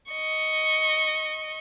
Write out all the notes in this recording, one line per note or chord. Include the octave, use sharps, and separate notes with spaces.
D#5 C#6